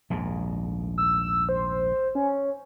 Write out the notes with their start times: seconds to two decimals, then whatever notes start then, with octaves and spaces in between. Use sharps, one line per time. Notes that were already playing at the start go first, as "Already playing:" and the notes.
0.10 A#1 D#2 G#2
0.98 E6
1.49 C5
2.15 C#4